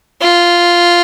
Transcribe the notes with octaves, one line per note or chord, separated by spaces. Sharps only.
F4